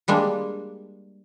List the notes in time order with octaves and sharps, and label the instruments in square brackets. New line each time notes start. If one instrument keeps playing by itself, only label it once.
[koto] G3 G#3 A#3 D4